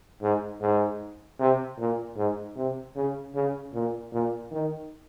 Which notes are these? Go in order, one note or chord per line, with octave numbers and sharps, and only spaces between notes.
G#2
G#2
C3
A#2
G#2
C3
C#3
C#3
A#2
A#2
D#3